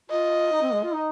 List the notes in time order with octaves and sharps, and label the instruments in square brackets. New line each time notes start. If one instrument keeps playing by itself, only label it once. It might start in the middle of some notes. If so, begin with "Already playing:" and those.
[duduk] F4 [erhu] D#5
[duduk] D#4
C4
G#3
F4
D#4